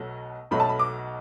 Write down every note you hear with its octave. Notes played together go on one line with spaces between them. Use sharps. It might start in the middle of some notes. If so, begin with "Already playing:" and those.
Already playing: B1 B2 F#3 A3
B1 B2 F#3 A3 B5
A5
B5
D6